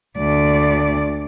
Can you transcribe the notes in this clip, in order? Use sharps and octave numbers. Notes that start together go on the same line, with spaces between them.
D2 D5